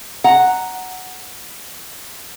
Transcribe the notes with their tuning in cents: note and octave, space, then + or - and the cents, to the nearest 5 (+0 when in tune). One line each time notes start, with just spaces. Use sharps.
F#5 +0 A#5 +0